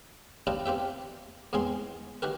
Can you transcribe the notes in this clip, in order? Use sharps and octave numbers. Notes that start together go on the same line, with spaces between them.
D4 E4 F4 G4 D5 D#5
C4 F4 G4 E5
E2 G#2 G#3 C4 G#4 C6
D#3 F#4 G4 A#4